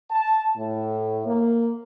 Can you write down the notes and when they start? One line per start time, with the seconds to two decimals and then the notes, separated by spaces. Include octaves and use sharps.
0.10 A5
0.55 A2
1.25 A#3